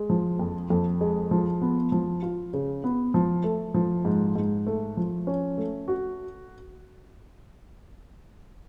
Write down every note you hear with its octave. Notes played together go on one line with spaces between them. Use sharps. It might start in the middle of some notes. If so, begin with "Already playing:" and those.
Already playing: G#3
F3
F2
F2
G#3
F3
B3
F3
F4
C#3
B3
F3
A3
F3
G#2
G#2
A3
F3
C#4
A3
F#4